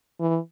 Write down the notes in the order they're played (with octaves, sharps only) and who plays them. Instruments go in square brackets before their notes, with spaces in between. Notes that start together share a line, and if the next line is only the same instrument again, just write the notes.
[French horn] E3